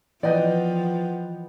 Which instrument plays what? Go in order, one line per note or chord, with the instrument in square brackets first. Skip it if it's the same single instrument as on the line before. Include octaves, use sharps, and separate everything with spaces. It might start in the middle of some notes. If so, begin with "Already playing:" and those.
[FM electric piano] E3 [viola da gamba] F3 [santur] B3 F#5 G5 [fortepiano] D5 D#5